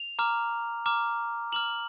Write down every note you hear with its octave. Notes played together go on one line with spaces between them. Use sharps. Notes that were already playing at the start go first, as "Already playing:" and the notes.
Already playing: F7
A#5 D6 F6
A#5 D6 F6
A#5 D6 F6 F#7